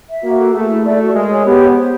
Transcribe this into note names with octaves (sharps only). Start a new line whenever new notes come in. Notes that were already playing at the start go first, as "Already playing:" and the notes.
E5
A#3 F#4
A4
A3 G#4
E4
A3 D5
F#4
G#3 A#4
C#5
B3 G4
F#5
C5